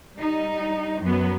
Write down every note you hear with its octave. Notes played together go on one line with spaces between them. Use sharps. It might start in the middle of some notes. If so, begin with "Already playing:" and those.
G3 D#4
F#2 F#3 B3